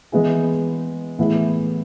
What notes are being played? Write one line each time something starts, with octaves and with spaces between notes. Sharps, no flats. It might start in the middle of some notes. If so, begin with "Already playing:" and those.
E3 G#3 B3 E4 G#4
A2 E3 B3 E4 G#4